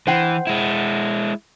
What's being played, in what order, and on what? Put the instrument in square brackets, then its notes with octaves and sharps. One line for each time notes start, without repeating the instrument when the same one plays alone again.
[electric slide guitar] E3 [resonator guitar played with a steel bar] C5 F#5 G5
[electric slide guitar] G#3 E4